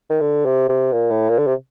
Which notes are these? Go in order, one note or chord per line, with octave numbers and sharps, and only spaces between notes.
D#3
D3
C3
C3
A#2
A2
A#2
D3
C3